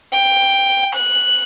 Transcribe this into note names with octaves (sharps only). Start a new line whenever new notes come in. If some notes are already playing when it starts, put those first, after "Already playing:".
G5
F#6